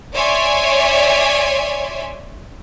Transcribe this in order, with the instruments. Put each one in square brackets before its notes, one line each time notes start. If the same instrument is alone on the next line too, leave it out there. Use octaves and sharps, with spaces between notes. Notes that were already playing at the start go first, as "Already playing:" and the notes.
[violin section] C#5 D5 E5 G#5 C6